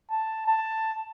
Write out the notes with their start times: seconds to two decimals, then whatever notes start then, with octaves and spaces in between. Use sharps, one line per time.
0.10 A5
0.47 A5